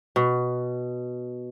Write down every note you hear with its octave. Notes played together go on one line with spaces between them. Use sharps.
B2